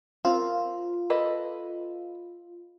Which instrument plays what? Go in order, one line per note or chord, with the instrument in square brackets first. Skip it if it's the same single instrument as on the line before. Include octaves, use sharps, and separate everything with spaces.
[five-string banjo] C4 A#4 [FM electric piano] F4
[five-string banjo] A4 B4 D#5